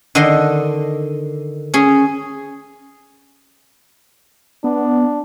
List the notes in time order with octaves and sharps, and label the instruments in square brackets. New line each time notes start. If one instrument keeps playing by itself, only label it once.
[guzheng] D3 D#3 D#5 A5 C6
C#4 G#4
[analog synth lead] B3 [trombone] D4